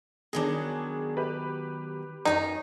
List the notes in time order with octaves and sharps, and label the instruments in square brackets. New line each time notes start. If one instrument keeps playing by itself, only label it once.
[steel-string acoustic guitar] B2 D#3 F#3 [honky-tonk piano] D4 G#4
[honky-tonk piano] G4 B4
[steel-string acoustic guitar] F#2 A4 C#5 [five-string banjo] D#4